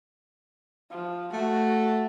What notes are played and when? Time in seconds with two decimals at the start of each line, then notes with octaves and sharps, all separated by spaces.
0.91 F3
1.33 A3 F#4